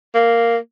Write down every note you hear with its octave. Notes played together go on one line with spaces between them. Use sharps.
A#3